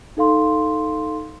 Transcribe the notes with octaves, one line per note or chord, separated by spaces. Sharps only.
D#4 A4 F5 C6